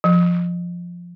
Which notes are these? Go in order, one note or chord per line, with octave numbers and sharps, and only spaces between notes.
F3